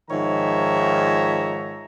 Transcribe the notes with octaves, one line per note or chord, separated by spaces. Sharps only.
G#2 D#3 F3 C#5 E5 A#5